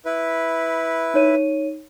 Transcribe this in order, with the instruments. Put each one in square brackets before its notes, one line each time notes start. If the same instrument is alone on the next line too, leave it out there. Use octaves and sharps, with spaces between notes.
[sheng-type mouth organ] E4 B4
[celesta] D#4 C#5 D#7